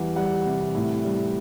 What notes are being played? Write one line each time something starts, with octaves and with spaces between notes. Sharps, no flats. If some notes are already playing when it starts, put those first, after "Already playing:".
Already playing: E2 G3 F#5
G3 F#5
C3
A2
G3